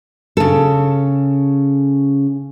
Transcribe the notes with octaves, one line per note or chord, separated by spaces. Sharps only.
C#3 A4